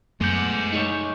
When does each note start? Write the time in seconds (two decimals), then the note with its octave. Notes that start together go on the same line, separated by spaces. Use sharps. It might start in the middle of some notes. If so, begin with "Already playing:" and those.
0.21 F#2 G#3 A3 B3 F#5 D6 G6
0.73 D#4 G#4 C#5